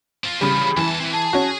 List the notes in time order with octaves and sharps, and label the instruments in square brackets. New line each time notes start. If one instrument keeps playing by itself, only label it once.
[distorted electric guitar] C4 F4
[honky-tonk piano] C#3 G3 [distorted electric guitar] E3 F4 [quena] B5
[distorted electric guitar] E2 A5 [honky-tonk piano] E3
[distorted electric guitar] C4 B4
[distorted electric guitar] G#4 [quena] A5
[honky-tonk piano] C#4 F#4